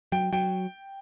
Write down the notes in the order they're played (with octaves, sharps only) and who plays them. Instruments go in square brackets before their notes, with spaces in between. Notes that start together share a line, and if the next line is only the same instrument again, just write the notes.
[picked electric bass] F#3 [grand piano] G5
[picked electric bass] F#3 [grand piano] G5